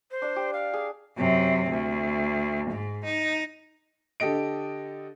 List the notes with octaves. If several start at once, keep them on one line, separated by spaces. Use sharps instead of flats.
C5
D4 E6
G4
F5
G#4
F#2 C3
D2
G#2
D#4
D3 G4 A4 D#5 D7